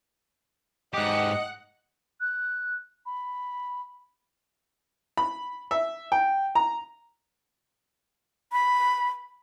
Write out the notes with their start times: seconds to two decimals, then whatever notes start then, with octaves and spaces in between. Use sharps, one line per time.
0.94 G#2 G4 D#5 F#5
2.21 F#6
3.06 B5
5.18 B5
5.71 E5
6.12 G5
6.55 A#5
8.52 B5